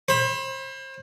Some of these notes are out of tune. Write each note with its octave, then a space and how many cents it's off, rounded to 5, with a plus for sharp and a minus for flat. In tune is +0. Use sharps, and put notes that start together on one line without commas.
C5 +35 B5 +0